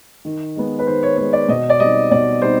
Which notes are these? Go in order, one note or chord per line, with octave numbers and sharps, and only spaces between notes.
D#3
G#3 B3
B4
D#3 C5
C#5
G#3 B3 C#5
D5
B2 D#5
D5
G3 C4 D#4 D#5
B2 D5
G3 C4 D#4 C5